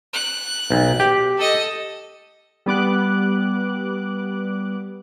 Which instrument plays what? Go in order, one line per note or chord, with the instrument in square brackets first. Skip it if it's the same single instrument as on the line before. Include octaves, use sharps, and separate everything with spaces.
[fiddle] F#6
[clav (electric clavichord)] B1
G4
[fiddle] A4 D#5
[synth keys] G3 B3 D6 F#6